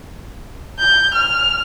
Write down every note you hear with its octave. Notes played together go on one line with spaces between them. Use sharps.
G6
F6